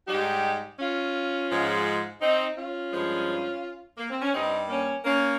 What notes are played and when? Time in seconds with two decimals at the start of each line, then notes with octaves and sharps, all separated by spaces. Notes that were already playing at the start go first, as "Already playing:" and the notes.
0.08 G#2 G3 D#4 G4
0.79 C#4 F4
1.50 G#2 F3 G#3
2.21 C4 D#4
2.56 C#4 F4
2.91 G2 F3 G#3
3.98 A#3
4.10 C4
4.22 C#4
4.33 G2 G3 C4 D#4
4.68 A#3 C#4
5.04 A#3 C#4